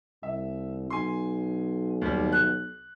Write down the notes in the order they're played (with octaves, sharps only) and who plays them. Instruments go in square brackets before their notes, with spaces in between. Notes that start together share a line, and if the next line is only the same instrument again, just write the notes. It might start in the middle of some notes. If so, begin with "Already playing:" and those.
[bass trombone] C2 [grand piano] E5
[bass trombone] B1 [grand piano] G#5 C6
[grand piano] D#2 G3
F#6